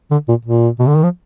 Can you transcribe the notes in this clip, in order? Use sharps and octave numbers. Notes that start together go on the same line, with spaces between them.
D3
A#2
A#2
B2
D3
D#3
F3